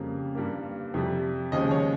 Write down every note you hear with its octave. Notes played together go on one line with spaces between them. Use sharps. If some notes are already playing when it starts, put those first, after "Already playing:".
Already playing: F2 C#3 G3 A#3
G2 G3 A#3
F2 C3 G3
D#2 C#3 F3 G#3 D#5
C#5